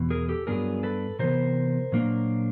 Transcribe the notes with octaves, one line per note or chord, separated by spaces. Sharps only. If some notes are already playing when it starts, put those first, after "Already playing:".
Already playing: E2 B2
G#4 A#4
G4 A4
G2 D#3 F#3 B3 D4 G#4 A#4
A4 B4
C3 E3 B3 A#4 C5
A#2 F#3 A#3 D4